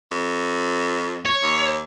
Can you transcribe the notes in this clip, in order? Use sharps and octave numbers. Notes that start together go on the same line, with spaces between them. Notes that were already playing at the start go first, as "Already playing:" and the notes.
F2
C#5
D#2